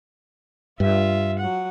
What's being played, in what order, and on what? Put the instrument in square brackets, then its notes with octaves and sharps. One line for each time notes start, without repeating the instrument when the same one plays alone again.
[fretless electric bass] G2 [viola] F4 E5
[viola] F#3 F#5